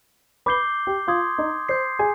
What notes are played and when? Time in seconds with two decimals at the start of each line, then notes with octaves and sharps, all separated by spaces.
0.46 B4 B5 D6 G6 C7 G7
0.87 G4 G5
1.07 F4 F5 C6 D#6 G#6
1.38 D#4 D#5
1.69 C5 C6 G6 C7
1.99 G#4 G#5